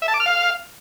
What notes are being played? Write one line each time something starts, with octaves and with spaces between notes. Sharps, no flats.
E5
A5
D6
F6
F5